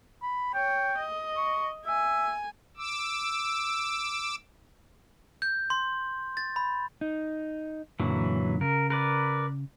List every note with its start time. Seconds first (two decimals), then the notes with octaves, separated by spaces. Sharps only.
0.22 B5
0.54 C#5 G5
0.99 D#5
1.37 C#6
1.86 E5 G#5
2.77 D6 E6
5.42 G6
5.70 C6
6.37 A6
6.56 B5
7.01 D#4
8.00 F#2 A#2 D3 E3 F#3
8.61 C#3 A#4
8.90 A#4 B4 D5